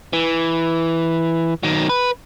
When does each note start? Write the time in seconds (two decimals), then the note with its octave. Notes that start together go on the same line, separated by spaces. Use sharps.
0.13 E3
1.63 D#3 F#3
1.89 B4